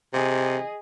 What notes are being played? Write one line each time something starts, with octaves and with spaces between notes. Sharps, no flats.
C3 G#4 D#5